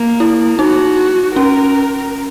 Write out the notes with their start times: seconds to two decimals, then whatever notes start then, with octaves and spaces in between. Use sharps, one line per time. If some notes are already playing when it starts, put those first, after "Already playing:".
Already playing: A#3
0.20 E4
0.59 D#4 F#4
1.36 C#4 A#4